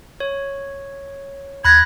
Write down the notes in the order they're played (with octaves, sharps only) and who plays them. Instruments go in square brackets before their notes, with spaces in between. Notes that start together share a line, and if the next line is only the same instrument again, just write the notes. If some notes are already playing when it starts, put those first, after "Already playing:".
[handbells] C#5
[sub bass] D#2 [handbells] B5 F#6 A#6 [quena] G#6